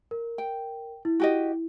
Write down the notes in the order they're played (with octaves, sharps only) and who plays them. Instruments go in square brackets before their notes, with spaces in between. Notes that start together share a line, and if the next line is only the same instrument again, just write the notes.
[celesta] A#4
[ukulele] G5
[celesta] E4
[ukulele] F#4 G4 D#5